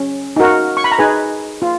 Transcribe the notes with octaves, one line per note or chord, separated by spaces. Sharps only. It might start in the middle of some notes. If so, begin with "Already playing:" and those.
Already playing: C#4
D#4 F#4 A#4
C#6
B5
A#5
D#4 G#4 B4 G#5
F4